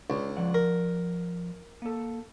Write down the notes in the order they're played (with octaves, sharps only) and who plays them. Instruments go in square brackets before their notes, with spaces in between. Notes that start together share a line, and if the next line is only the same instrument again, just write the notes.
[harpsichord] C#2 [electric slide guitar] D4
[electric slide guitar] F3 D5 F#5
[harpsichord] A#4
[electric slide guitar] A#3 A4